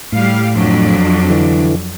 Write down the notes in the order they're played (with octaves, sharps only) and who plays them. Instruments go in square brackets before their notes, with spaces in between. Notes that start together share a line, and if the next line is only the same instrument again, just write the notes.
[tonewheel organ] A2 [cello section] G3 F5
[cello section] F2 F#3 D4
[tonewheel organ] D3 E3